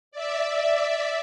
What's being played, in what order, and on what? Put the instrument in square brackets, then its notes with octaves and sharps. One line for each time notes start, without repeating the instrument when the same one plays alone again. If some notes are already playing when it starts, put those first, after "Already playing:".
[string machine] D5 E5